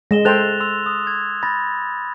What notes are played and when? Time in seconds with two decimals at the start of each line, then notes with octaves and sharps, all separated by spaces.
0.11 G#3 A#6 E7 G7
0.25 A4 C5 G5 F#6 A6 F7
0.60 C6 E6 F7
0.86 D#6
1.07 G#6
1.43 B5 A6 A#6